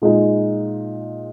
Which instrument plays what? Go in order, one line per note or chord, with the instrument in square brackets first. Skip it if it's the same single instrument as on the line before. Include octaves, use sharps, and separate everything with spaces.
[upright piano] A#2 G#3 D#4